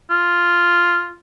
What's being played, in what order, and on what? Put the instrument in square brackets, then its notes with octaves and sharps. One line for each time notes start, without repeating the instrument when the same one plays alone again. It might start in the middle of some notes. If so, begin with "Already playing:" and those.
[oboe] F4